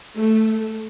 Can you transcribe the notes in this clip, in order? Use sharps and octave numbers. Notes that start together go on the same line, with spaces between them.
A3